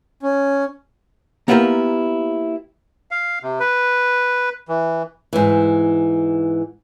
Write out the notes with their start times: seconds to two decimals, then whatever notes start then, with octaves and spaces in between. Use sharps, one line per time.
0.23 C#4
1.48 A#3 B3 E4 F4 G4 A#4
3.11 F5
3.43 C3
3.60 B4
4.68 E3
5.33 G#2 E3